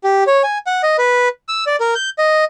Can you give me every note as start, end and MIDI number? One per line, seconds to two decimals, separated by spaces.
0.04 0.24 67
0.27 0.42 73
0.44 0.58 80
0.67 0.82 78
0.83 0.96 75
0.98 1.29 71
1.48 1.65 88
1.67 1.76 74
1.80 1.94 70
1.95 2.10 91
2.18 2.44 75